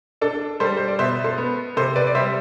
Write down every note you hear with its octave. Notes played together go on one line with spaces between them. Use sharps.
D4 A4
G3 A4 C5
C5
D5
B2 C5 E5
A4 C5
B3
C3 A4 C5
B4 D5
D5
G3 C5 E5